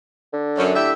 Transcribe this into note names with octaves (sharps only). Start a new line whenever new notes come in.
D3
F#2
A2 G4 E5